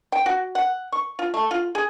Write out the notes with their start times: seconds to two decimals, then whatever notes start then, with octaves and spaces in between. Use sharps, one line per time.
0.12 G5
0.26 F#4
0.55 F#5
0.92 C#6
1.19 F4
1.34 A3
1.51 F4
1.75 G#4